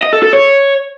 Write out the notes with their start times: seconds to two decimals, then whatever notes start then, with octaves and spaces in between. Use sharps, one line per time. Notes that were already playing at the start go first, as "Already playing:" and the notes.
0.03 D#5
0.13 A4
0.23 A4
0.33 C#5